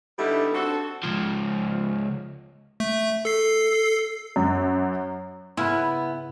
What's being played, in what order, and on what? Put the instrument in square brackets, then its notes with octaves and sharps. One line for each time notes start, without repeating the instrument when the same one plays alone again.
[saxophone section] D3 G3 A3 B3 D#4 E4
C4 D4 F#4 A4
[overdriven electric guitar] C#2 F3
[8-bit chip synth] A3 E5
A4 C7
[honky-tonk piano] F#2
[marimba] G#2 C#3 [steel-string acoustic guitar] B3 [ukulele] E4 [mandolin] G#5 B5 F#6